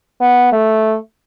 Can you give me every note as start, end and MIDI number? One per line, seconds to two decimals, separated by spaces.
0.21 0.47 59
0.52 0.96 57